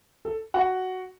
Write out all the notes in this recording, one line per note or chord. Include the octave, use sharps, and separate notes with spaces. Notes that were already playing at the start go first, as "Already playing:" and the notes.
A4
F#4 F#5